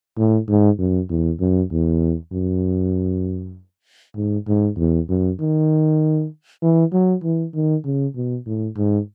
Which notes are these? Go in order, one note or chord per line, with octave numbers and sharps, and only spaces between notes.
A2
G#2
F#2
E2
F#2
E2
F#2
G#2
G#2
E2
F#2
D#3
E3
F#3
E3
D#3
C#3
B2
A2
G#2